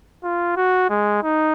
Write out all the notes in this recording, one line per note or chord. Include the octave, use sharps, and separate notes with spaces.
F4
F#4
G#3
D#4